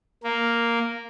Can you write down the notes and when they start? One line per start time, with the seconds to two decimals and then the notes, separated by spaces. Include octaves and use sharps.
0.24 A#3